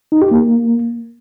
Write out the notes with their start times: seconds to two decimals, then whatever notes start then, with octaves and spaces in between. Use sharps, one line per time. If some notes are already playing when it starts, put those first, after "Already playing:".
0.12 D#4
0.22 G4
0.31 A#3